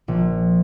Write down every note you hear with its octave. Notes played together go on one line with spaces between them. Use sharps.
A#1